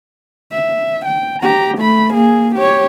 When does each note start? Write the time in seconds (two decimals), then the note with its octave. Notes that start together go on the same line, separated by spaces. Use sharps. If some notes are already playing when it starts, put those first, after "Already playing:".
0.52 E5
1.05 G5
1.42 G4 A#5
1.77 A3 B5
2.13 A#3 G#4
2.55 G4 C#5